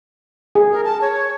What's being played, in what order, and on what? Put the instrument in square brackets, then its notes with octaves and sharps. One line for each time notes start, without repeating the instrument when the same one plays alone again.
[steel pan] G#4
[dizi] A#4
A5
C#5